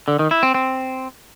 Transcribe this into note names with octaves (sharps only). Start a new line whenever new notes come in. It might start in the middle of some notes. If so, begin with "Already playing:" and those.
D3
D#3
E4
C4
C4